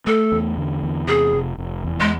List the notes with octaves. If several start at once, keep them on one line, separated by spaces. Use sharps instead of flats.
A3 A4
E2
D3
E2
C3 G#4
F1
F1
E2
G#3